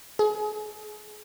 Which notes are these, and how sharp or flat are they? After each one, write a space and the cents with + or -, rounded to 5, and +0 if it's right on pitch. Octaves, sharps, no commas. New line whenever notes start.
G#4 +30